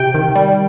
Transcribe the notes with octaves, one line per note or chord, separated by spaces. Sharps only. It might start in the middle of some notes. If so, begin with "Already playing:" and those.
Already playing: C3 G5
D#3
G3